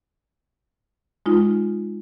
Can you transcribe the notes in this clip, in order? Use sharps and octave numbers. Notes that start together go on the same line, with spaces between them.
G#3 D#4 F4